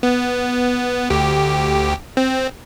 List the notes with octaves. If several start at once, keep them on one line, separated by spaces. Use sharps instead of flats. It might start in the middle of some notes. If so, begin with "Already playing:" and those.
B3
D2 G4
C4